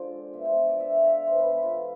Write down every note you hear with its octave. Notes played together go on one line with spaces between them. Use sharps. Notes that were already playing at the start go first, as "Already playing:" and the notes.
Already playing: D3 F3 G#3 D4 F4 A4 C5 D5
B2 B3 D4 E5
C5
D5
D5
E5
F5
E5
G#2 E3 B3 C5
B4
A4
F4